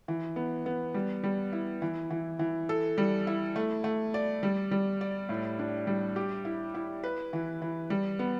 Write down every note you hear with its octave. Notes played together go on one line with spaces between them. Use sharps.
E3
B3
B3
G3
G3
E4
E3
E3
E3
A4
G3
E4
A3
A3
D5
G3
G3
D5
A2
D4
G3
G4
E4
E4
B4
E3
E3
G3
B3